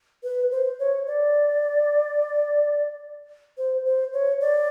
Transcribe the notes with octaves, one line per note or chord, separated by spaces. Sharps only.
B4
C5
C#5
D5
C5
C5
C#5
D5